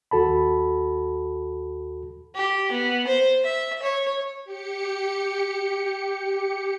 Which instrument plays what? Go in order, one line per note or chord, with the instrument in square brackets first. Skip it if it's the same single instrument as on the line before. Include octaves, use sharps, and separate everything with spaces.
[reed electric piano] D#2 F#4 A4 A5 B5
[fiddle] G4
B3
C5
E5
C#5
[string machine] G4 C#7